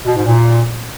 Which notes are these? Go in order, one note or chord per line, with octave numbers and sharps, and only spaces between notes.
B2
G#2
A#2